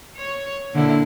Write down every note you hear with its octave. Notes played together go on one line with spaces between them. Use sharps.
C#5
A#2 D3 E4